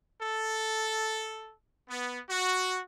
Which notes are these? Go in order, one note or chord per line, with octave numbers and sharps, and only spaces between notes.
A4
B3
F#4